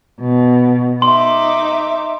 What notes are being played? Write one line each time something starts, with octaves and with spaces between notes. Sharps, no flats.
B2
D#4 E5 C6 D6